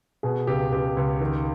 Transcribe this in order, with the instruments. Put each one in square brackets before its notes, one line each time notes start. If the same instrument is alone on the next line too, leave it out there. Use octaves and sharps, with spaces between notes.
[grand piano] B2 G#4
C#2 G4
C#2 G4
C#2
D#3